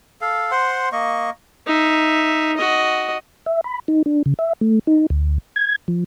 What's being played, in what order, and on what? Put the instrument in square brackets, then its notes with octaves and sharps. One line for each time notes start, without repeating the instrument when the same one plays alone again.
[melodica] A4 F5
C5 F#5 C6
A#3 D#5 C#6
[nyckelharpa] D#4 E5
F#4 D#5
[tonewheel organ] E5
B5
D#4
D4
C#3
E5
A3
D#4
D2
G#6
F3